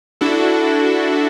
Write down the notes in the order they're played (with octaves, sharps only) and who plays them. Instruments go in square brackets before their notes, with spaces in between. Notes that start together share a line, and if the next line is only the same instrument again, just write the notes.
[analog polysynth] D4 E4 F#4 A4